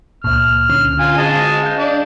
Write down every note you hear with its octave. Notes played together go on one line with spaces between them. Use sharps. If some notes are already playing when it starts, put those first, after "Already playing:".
C#2 A#2 F6
D3 C#4
F4 G#5
G#3 D#5 A5
F5 G6
D4